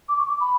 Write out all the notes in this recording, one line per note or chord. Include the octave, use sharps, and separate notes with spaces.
D6
C#6
D6
B5